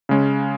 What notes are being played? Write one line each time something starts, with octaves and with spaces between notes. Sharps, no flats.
C#3 G#3 C#4